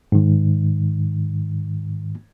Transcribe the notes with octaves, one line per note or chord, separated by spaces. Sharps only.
G#2 D#3